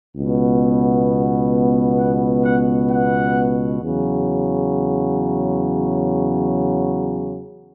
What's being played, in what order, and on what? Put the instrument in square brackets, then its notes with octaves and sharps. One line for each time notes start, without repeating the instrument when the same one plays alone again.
[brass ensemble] C#2 B2 B3
F#5
F#5
F#5
E2 C#3 F#3